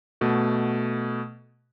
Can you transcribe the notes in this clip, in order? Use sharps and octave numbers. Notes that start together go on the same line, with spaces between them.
B2 A3 F#4